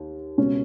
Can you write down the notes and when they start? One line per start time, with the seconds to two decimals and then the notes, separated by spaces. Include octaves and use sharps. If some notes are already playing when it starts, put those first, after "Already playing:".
Already playing: D#2
0.38 C#2 B2 C#4